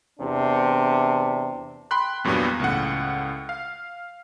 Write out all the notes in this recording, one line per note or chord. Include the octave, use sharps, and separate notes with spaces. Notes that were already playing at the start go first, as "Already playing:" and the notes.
E2 C3 D4
G5 B5 C6 F#6
E2 G2 A#2 F#3 G3 B3
C#2 A2 F#5
F5